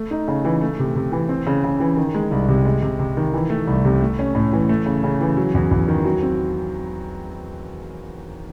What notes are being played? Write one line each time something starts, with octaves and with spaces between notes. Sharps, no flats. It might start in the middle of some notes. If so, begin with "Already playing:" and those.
Already playing: A3
D#4
C#3
E3
A3
C3
C3
E3
C4
C#3
C#3
E3
D#3
G#3
C2
C3
G#3
C3
C3
D#3
E3
A3
C2
C3
A3
C#4
A2
E3
A3
C#3
C#3
E3
F#3
E2
E2
D#3
F#3
C4